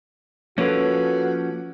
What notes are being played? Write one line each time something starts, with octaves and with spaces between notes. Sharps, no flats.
F3 A#3 C#4 F#4 A4 B4 C#5